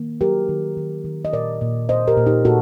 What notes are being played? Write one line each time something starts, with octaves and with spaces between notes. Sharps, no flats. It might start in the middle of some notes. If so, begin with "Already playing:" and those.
Already playing: D#3 A#3
F#3 G4 A#4
D#3
D#3
D#3
D#5
A#2 A#4 D5
A#2
A#2 C5 D#5
G4 A#4
A#2
D#4 G4
A#2 F#4 A4